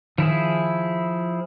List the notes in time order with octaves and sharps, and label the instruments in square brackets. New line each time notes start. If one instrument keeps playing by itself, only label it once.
[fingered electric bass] D#3 [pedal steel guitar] F3 E4 G#4